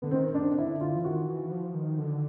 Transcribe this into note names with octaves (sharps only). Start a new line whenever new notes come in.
D3 B3
D#3 C4
D4
D3 E4
F4
E3
D#3 F#4
E3
F3
D#3
D3